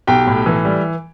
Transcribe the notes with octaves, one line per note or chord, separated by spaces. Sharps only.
B1 G4 G5
A2
E3
G3